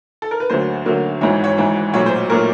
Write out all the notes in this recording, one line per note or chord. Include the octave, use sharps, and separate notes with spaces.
A4
A#4
B4
D2 D3 F#3 A#3 C5
D2 D3 F#3 A#3
G#1 G#2 E3 C#5
C#5
G#1 G#2 E3
B1 A#2 F#3 A3 C#5
C5
A#2 F#3 A3 A#4